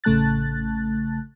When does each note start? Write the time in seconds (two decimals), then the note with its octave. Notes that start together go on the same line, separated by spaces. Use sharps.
0.04 A1 C#3 A3 A5 F#6 A6